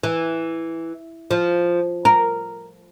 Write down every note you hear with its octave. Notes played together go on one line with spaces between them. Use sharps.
E3
F3
A#4